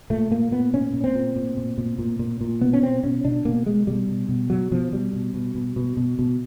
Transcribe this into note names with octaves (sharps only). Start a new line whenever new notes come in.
A#2 A3
A#2 A#3
A#2 B3
A#2 C#4
A#2
C4
A#2
A#2
A#2
A#2
A#2
A#2
A#2
B2 B3
C#4
B2 C4
B2 C#4
B2 D4
B2 A#3
B2 G#3
B2 G3
B2
B2
B2 F#3
B2 F3
B2 G3
B2
B2
B2
B2
B2
B2